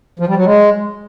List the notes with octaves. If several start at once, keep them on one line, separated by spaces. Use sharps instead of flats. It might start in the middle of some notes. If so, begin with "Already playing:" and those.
F3
G3
F#3
G#3